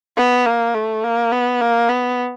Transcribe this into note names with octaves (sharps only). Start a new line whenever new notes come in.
B3
A#3
A3
A#3
B3
A#3
B3